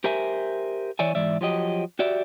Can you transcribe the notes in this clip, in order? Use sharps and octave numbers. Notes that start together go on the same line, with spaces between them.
G4 A#4 C5 E5 G#5
E3 C#5 D5 E5 G#5
G#2 E3 D5 E5
F3 F#3 G4 D#5
F#4 G4 D5 E5